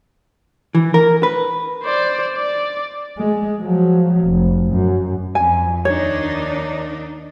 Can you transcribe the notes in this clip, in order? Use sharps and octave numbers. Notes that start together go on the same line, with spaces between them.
E3
A#4
B4
C5 D5
D5
G#3
F3 F#3
F1
F#2
F2 G#5
D#2 D4 D#4 C#5